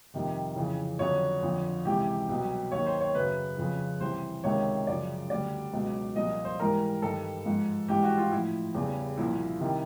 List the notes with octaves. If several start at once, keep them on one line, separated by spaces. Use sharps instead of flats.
F2 C3 D#3 G3
F2 C#3 E3
F2 D3 F#3 C#5
F2 D3 F3
C#2 C3 E3 G4
C2 B2 F#3
D#2 D#3 F#3 C#5
C5
C#5
F#2 C#3 F#3 B4
F2 C#3 F3
C2 C3 E3 C5
C#2 C3 D#3 C#5
F#2 C#3 F3 D5
D2 D3 G3 D5
C#2 B2 F#3
C2 A#2 F3 D#5
C5
G#2 E3 G3 A#4
G2 D#3 G3 A4
G#2 F3
G#2 E3 G3 G4
F#4
F4
A2 F3 E4
E2 C#3 E3 G3
C2 A#2 F3 E4
C3 D#3 G3